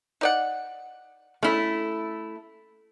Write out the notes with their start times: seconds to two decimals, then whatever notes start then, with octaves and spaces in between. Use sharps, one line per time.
0.21 D#4 D5 F#5
1.43 A3 C#4 E4